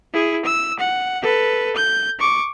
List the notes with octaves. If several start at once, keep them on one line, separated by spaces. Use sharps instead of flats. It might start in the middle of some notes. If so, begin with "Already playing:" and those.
E4 G#4
E6
F#5
A4 B4
G6
C#6 D6